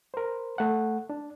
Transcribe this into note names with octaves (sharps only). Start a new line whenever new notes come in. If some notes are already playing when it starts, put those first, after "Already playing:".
A#4 C5
A3 F#5
D4